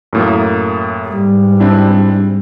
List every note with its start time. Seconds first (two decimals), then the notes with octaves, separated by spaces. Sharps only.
0.13 F#2 A2 A#3
1.08 G#2 G3
1.60 C4 D4 E4